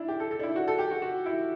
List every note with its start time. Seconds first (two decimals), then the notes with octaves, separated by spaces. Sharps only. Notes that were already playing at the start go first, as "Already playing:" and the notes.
Already playing: D4 E4
0.08 G4
0.20 A4
0.31 A4
0.39 D4
0.43 E4
0.56 F#4
0.68 A4
0.79 G4
0.91 F#4
1.02 F#4
1.26 E4